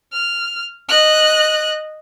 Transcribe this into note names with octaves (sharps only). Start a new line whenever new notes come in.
F6
D#5 F#6